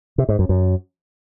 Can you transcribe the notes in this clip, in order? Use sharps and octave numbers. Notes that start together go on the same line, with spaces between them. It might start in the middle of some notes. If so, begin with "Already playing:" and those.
C3
G#2
F#2
F#2